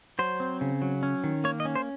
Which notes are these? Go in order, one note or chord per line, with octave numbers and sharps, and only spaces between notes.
F#3 C5
C4
C#3
F#3
C#4
D#3
A#3 C#5
D#5
C#4
C5